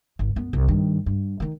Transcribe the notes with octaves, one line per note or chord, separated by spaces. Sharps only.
G#1
F#2 B3
C2
G2 D#3
G2
D#3 D#4